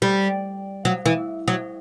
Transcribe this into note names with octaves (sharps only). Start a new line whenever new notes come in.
G3
F#3
E3
F#3